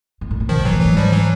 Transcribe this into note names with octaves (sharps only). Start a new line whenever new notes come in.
G#2
A2
A#2
B2 D#3 F3
A#2 E3 F#3
A2
G#2 E3 F#3
F3 G3
E3 F#3